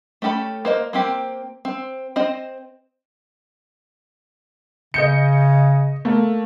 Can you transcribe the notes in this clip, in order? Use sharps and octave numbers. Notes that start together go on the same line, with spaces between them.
A3 C#4 G4 A4 B5
A#3 C5 D#5
A#3 C4 G4
C4
C4 C5 D#5
C#3 D#5 G6 C#7
A3 A#3